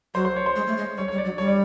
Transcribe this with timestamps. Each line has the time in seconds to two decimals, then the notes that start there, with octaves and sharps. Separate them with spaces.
0.14 F#3 C5
0.25 C5
0.36 C#5
0.46 C5
0.56 G#3
0.67 A3
0.77 G#3
0.97 G3 C#5
1.08 C#5
1.12 G3
1.18 D5
1.25 F#3
1.38 G3 C#5
1.48 D5